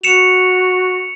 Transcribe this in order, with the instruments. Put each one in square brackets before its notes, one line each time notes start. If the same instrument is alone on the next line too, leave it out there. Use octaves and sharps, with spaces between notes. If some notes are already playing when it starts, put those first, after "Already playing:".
[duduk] F#4 [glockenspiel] C#7 E7 F7